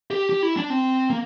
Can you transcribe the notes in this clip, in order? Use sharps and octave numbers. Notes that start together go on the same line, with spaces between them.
G4
G4
E4
D4
C4
A#3